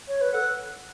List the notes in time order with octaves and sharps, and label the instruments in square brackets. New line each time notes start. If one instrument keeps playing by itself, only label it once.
[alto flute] C#5
B4
[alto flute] A4 [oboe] F#5